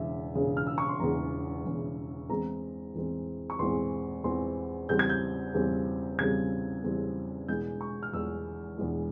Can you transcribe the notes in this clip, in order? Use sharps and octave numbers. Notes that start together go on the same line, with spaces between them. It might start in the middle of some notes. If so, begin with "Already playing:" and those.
Already playing: E1 E2 C#3 E5
E1 E2 C#3
F6
E6
C#6
C6
E1 E2 C#3 A#5
E1 E2 C#3
E2 E3 G#3 C4 A#5
E2 E3 G#3 C4
C#6
E2 E3 G#3 C4 C6
E2 E3 G#3 C4 C6
E2 C#3 G3 C4 G6
G#6
G6
E2 C#3 G3 C4
E2 C#3 G3 C4 G#6
E2 C#3 G3 C4
E1 E2 E3 G#3 G6
C#6
F6
E1 E2 E3 G#3 E6
E1 E2 E3 G#3